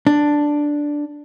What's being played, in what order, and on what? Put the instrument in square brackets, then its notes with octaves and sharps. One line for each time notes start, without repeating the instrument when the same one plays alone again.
[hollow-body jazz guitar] D4